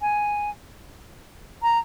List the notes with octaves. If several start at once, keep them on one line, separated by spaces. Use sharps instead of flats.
G#5
A#5